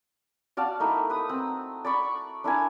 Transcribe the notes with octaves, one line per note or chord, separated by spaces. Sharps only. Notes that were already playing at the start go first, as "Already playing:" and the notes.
F#4 D5 F5 A5
A3 A#3 D#4 E4
B4 D#6
C4
D5 B5 C#6
D4 E4 A#4 G#5